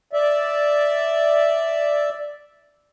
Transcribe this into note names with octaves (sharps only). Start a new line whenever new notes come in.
D5 E5